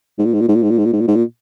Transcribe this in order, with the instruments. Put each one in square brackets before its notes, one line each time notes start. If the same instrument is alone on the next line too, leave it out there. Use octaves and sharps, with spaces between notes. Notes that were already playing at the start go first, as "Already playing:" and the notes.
[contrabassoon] G#2
A#2
G#2
A#2
G#2
A#2
G#2
A#2
G#2
A#2
G#2
A#2
G#2
A#2